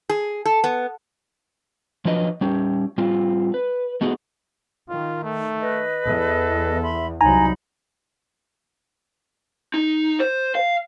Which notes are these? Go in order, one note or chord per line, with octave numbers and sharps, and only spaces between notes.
G#4
A4
B3
F3 F#3 D4 B4 D#5
G3 C#4 G4
G3 C4 F4
B4
A3 B3 D#4 F#4 G#4
D#3 F4
A3
B4 D#5
E2 A4
E5 B5 C6
C2 F#3 D#4 G#5 A#5 B5
D#4
C5
F5